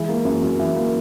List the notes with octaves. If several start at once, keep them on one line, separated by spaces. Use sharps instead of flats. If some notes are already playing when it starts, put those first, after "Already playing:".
Already playing: E3 G#3
A#3
F#2
F#2
E3
A#3